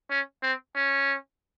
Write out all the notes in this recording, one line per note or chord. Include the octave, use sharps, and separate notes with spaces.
C#4
C4
C#4